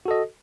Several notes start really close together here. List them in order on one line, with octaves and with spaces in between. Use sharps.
F#4 A4 D#5